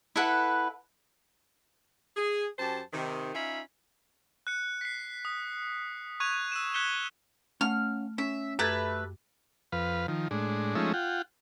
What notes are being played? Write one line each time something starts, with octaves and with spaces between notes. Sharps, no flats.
E4 A4 B4 F#5
G#4
F#2 G4 C5 A5
C3 D#3
C#4 D#4 F4 E5 B5
F#6 C#7
B6 C7
D#6
C#6 F#6 G#6 D#7 F7
E6 D#7 E7
F#6 G#6 B6 C#7 E7 G7
A3 C#4 F5 F#5 F6
C#4 E5
F#2 A3 G4 B4 G#6 A6
F2 B4 F5
D#3 F3
A2 G#3 D4
F3 G#3 A3 C#4 D#4 E5
F4 F#5 G5